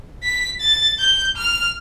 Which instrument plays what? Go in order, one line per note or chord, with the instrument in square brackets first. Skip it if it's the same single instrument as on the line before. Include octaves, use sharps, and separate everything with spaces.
[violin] B6
A6
G6
F6